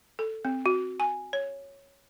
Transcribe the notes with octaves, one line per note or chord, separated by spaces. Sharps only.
A4
C4
F#4
G#5
C#5